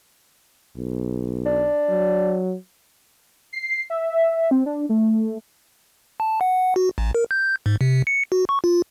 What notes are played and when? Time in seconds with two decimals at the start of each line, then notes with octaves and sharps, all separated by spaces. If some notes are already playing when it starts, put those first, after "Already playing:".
0.77 B1
1.46 D4
1.89 F#3
3.53 C7
3.90 E5
4.51 C4
4.66 D4
4.89 A3
6.20 A5
6.41 F#5
6.76 F#4
6.98 A1
7.15 A#4
7.31 G6
7.66 G#2
7.81 C3
8.07 C#7
8.32 F#4
8.49 C#6
8.64 F4